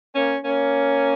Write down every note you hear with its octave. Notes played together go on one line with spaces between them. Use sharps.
A#3 C#4
A#3 C#4